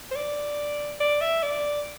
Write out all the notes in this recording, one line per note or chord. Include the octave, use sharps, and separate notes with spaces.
C5
D5
D5
E5
D5